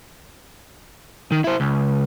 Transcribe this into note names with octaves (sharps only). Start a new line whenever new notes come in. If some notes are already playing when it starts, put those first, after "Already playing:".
D#3
E4 C5
C#2